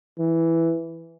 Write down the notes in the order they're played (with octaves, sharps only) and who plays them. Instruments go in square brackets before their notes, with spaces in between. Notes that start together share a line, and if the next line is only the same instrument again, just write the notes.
[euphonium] E3